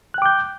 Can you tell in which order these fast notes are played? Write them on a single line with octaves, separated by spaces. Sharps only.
F#6 G5 D6 G6